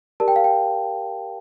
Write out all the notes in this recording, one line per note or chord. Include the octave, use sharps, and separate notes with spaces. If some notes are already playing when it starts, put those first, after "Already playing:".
G4 A#4 D5 A5
G5
F5
G5